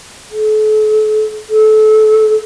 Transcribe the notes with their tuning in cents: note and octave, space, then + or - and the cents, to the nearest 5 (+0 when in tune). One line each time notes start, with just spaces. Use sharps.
A4 -40
A4 -25